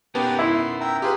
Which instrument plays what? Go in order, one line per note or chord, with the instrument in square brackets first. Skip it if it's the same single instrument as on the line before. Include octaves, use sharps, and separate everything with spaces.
[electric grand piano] B3 [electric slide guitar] C#4 D#4 A#4 [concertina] G4 B4 A5
[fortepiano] E4 [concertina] C6
[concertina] E5 G5 A#5
[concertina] F4 A#4 [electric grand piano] G4 G#4 B4